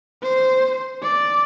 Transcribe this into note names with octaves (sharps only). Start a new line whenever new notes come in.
C5
D5